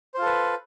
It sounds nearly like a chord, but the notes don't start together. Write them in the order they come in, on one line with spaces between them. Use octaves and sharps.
C5 F4 A4 B4